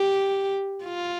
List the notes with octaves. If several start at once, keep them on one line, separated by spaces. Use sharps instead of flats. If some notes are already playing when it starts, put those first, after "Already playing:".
Already playing: G4
F4